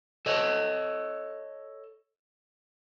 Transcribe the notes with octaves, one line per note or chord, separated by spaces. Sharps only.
A4 C#5 D#5